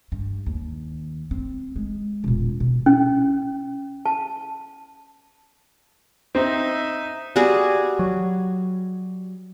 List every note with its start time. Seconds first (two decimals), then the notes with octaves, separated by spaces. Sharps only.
0.12 G2
0.46 D#2
1.31 C4
1.76 G#3
2.24 E1 A#2
2.60 B2
2.86 C#4
4.06 A5
6.35 C4 D#4 E5
7.36 G3 F#4 G#4
7.99 F#3